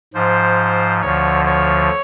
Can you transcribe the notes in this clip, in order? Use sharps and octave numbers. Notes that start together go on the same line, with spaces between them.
G#2 F3 C5
D2 D3 F3 C#5
C#5